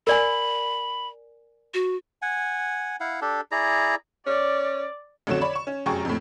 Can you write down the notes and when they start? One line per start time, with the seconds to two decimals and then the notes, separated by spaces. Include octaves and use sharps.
0.07 A#4 D5 G#5 B5
1.74 F#4
2.22 F#5 G#5
3.00 E4 F5 F#5
3.21 D4 G4 A4
3.52 E4 G#4 D5 A#5
4.27 C#4 D5
5.27 A1 F2 D3 F#3 C#5 E7
5.41 C#5 D5 B5
5.53 C#6 E7
5.67 C#4
5.86 F1 F#2 G#4 G5 A#5 C#6
6.05 F2 A2